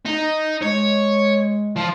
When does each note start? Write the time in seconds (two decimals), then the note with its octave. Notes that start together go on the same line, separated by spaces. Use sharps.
0.05 D#4
0.62 G#3 C#5
1.76 F3